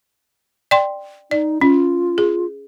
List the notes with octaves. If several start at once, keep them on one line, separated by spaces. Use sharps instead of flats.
D5 G5 C6
D#4 D5
C#4 F4
G#4